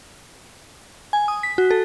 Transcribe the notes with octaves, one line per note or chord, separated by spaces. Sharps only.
G#5
D#6
B6
F#4
A4